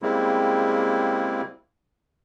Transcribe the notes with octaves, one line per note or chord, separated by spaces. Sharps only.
C#3 G3 G#3 A#3 C4 E4